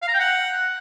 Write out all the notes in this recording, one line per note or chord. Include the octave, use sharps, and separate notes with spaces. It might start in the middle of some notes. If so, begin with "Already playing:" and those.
F5
A#5
G5
F#5